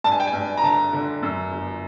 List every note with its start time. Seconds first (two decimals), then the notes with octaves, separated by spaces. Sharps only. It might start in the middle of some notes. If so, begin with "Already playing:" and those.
0.04 G2 A5
0.12 G#5
0.20 G5
0.27 G#5
0.34 G2
0.57 A#5
0.63 D3 A5
0.93 D3
1.23 F#2
1.52 G1